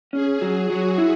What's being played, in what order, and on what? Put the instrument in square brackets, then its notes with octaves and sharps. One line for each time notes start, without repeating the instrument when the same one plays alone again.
[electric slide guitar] C#4 [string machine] G#4
[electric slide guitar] F#3
[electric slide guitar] F#3 [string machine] F#4
[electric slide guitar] E4